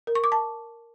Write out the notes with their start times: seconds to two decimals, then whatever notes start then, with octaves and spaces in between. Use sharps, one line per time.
0.07 A#4
0.15 C#6
0.24 D6
0.32 A5